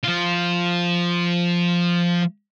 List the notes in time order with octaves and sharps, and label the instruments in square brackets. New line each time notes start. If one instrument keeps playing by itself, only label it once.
[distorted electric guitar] F3 F4